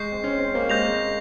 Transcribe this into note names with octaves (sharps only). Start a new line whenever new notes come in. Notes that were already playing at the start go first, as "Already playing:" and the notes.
Already playing: G#3 C#6 G6 C7
C4
C#4
C4
A#3
G#3 G6 A#6 F7